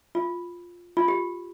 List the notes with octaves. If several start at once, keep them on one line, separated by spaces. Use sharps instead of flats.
F4
F4
G4